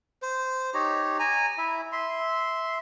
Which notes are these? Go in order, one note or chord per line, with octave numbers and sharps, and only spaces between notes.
C5
D#4 G4 C#5 A#5
G#5 A#5
E4 E5
E5 C6